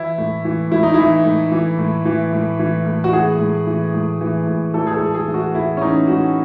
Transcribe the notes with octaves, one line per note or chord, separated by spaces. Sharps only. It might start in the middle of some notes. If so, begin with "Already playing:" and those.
Already playing: E3 E4
A2
E3
A2 E4
D#4
E3 E4
A2
E3
A2
E3
A2
E3
A2
F#4
E3 G#4
A2
E3
A2
E3
A2
E3 A4
G#4
A4
A2
G#4
E3
F#4
A2 E4
C#4
E3 D#4
A2 F#4